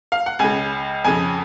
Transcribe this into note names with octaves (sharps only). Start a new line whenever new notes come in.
F5
F#5
C#2 C#3 G#5
F2 C#3 G#5